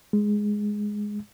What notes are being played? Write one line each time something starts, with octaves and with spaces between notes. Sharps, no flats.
G#3